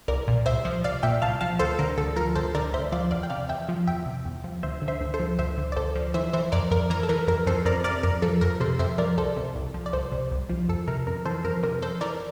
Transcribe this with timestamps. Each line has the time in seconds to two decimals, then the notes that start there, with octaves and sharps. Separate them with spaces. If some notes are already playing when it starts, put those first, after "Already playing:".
0.08 C2 A#4 D5
0.28 A#2
0.46 C2 C5 E5
0.65 F3
0.84 C2 D5 F5
1.03 A#2 E5 G5
1.22 C2 F5 A5
1.41 F3 F5 A5
1.59 D2 A4 C5
1.79 D3 A#4
1.98 D2 A4
2.16 F3 A#4
2.35 D2 A4 C5
2.55 D3 A#4 D5
2.73 D2 C5 E5
2.92 F3 D5 F5
3.11 E2 D5 F5
3.23 G5
3.30 C3 D5 F5
3.49 E2 E5 G5
3.69 F3
3.87 E2 E5 G5
4.06 C3
4.26 E2
4.44 F3
4.63 D2 C5 E5
4.82 D3
4.88 C5 E5
5.01 D2
5.14 A4 C5
5.20 F3
5.39 D2 C5 E5
5.57 D3
5.72 D5
5.76 D2 A4 C5
5.95 F3
6.14 E3 C5 E5
6.33 E3 C5 E5
6.52 F2 A#4 D5
6.71 F2 A#4
6.90 E3 A#4
7.03 A4
7.09 E3 A#4
7.27 F2 A#4
7.47 F2 A4 C5
7.65 F2 A#4 D5
7.84 C3 A#4 D5
8.03 F2 A#4
8.22 F3 A4
8.41 F2 A#4
8.60 C3 A4 C5
8.79 F2 C5 E5
8.98 F3 A#4 D5
9.17 C2 A4 C5
9.36 C3
9.55 C2
9.74 F3
9.86 D5
9.93 C2 A4 C5
10.12 C3
10.31 C2
10.49 F3
10.68 F2 A4
10.88 C3 A#4
11.07 F2 A#4
11.26 E3 A4 C5
11.44 F2 A#4
11.63 C3 A#4
11.82 F2 A4 C5
12.01 E3 A#4 D5